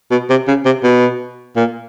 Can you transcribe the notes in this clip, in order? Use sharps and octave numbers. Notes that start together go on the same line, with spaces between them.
B2
C3
C#3
C3
B2
A#2